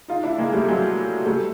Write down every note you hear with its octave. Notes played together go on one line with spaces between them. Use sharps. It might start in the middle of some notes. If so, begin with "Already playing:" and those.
D#4 F4
D4 E4
G#3 A#3
G3 A3
F#3 G#3
G3 A3